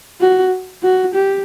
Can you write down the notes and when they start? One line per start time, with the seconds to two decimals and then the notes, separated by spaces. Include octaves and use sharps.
0.21 F#4
0.83 F#4
1.14 G4